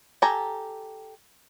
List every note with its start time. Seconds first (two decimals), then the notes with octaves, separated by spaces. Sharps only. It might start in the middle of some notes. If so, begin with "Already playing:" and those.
0.22 G4 A4 G#5 A#5